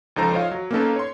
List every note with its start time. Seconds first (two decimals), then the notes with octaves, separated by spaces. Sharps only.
0.16 C#2 F3 D#4 A4 C5 A#5
0.33 F4 C5 C#5 D#5 F5
0.51 F#3
0.71 A#3 B3 C#4 D#4 A4 B4
0.96 C#5 C6